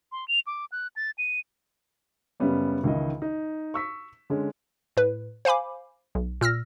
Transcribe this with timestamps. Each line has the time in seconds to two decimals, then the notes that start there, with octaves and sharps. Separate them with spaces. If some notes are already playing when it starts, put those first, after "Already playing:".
0.12 C6
0.28 F7
0.47 D6
0.72 F#6
0.96 A6
1.18 D#7
2.40 F#2 C#3 G3 B3 C#4
2.84 C#2 D#3 E3 D#5
3.22 D#4
3.74 C#6 E6 B6
4.30 D3 G#3 C#4
4.97 A2 B4
5.45 C5 F5 G#5 B5 D6
6.15 B1
6.41 A#2 E6 F6 A#6